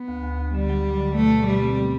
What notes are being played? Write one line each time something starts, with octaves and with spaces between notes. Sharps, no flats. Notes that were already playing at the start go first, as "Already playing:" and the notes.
Already playing: B3
D2
D2
D2
D3 G3
F#3
D3
D3
B2 A3
B2
B2 G3
C4
B3